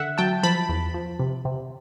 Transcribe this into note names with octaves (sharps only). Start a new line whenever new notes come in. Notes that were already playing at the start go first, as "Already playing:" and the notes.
Already playing: D3 E5 F#5
F#3 G5 A5
F3 A5 B5
E2
F3
C3
C3